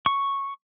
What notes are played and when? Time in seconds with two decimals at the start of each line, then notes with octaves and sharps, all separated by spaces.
0.06 C#6